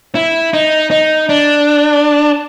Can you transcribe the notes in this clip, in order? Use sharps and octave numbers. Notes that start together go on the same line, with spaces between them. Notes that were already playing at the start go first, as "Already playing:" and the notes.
E4
D#4
D#4
D4